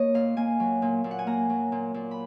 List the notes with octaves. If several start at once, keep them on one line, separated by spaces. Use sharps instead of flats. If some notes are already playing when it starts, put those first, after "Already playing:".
Already playing: A#3 C#5 D#5
A#2 F5
A#3 G#5
F#3
A#2
A#2
F#5
G#5
A#3 A#5
F#3
A#2
A#2
B5